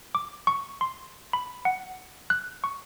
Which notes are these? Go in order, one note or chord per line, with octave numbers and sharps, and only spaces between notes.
D6
C#6
C6
B5
F#5
F#6
C#6